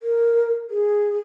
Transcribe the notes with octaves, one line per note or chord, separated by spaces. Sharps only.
A#4
G#4